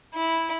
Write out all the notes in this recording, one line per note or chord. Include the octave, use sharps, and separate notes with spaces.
E4